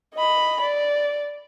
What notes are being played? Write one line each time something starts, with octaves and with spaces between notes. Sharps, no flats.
D#5 B5
D5